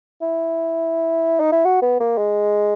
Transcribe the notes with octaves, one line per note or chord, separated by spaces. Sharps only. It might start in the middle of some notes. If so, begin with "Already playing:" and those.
E4
D#4
E4
F#4
B3
A#3
G#3